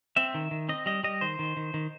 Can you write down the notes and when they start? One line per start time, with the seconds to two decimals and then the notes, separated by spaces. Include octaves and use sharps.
0.16 C4 E5
0.34 D#3
0.51 D#3
0.68 C4 D#5
0.86 G3 D#5
1.04 G3 D#5
1.21 D#3 C5
1.39 D#3
1.57 D#3
1.74 D#3